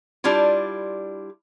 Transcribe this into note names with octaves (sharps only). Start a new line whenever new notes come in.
G3 D4 E4 F4